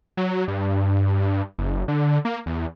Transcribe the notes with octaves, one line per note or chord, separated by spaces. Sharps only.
F#3
G2
F#1
D3
A#3
E2